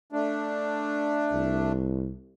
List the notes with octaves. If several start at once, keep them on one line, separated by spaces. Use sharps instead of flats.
A3 D4
C2